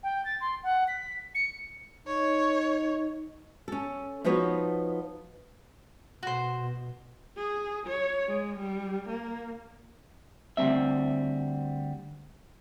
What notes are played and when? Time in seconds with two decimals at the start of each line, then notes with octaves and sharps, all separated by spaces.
0.03 G5
0.25 A6
0.41 C6
0.63 F#5
0.88 B6
1.35 C#7
2.07 D#4 C#5
3.68 C#4 A4
4.24 F3 B3 D#4 F#4 B4 C#5
6.23 B2 F#4 C5
7.37 G#4
7.87 C#5
8.27 G#3
8.59 G3
9.08 A#3
10.57 D2 D#3 G3 C4 E5